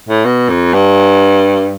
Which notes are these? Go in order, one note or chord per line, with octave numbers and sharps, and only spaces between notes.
A2
B2
F2
G2